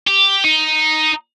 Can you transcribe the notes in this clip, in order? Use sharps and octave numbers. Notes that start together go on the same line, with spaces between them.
G4
D#4